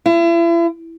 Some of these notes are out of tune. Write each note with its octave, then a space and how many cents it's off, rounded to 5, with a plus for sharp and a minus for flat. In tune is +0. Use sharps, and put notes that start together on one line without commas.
E4 +40